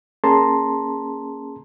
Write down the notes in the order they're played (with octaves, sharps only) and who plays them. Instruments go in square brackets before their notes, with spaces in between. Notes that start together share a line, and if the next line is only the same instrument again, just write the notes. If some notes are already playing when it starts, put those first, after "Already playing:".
[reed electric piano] A#3 C#4 G#4 A5 A#5 C6